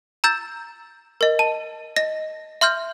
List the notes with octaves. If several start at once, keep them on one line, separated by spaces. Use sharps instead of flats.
A#5 E6 G6 A6
A#4 D#5
A5
D#5 A#6
E5 C6 F6 G6